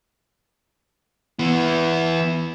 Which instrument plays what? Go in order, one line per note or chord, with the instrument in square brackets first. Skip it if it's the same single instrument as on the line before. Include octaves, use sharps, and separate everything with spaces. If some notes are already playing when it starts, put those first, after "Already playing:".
[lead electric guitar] E3 B3